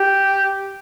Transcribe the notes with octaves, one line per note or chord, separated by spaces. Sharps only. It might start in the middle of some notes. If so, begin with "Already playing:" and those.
Already playing: G4